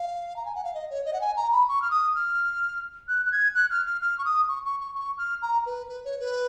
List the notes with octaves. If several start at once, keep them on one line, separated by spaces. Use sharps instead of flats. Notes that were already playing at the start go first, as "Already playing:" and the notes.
Already playing: F5
A#5
G#5
F#5
F5
D#5
C#5
D#5
F#5
G#5
A#5
B5
C#6
F6
D#6
F6
F#6
F#6
G#6
F#6
F6
F6
F6
C#6
D#6
C#6
C#6
C#6
C#6
F6
A#5
B4
B4
C#5
B4